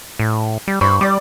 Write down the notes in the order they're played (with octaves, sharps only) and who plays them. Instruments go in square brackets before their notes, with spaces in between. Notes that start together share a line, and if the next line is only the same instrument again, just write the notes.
[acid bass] A2
G3
[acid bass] G2 [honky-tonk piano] C5 B5 C#6
[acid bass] G3 [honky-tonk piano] D5 D6